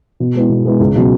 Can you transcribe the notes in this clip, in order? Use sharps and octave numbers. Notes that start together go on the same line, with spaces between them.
B2
G#3 B3 E4
B2
G#3 B3 E4
C#2
B2 F#3 C#4